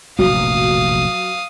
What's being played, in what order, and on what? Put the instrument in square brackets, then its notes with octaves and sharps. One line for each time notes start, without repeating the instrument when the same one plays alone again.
[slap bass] F1 A#1 A2 [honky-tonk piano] F#3 [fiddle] F5 D#6